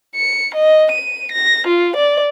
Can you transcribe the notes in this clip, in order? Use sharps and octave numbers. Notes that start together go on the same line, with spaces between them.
C#7
D#5
D#7
A#6
F4
D5